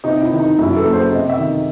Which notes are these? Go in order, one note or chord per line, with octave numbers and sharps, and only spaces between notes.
C3 D#4
E4
D#3
D#4
F#2 E4
A4
F#1
C5
C3 D#5
E5
D#3